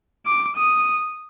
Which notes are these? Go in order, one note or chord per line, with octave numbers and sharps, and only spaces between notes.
D6
D#6